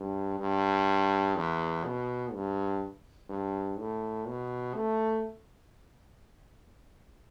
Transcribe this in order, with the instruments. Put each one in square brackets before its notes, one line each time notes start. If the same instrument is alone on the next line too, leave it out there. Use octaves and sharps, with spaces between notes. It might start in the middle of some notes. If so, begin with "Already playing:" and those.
Already playing: [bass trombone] G2
G2
E2
B2
G2
G2
A2
B2
A3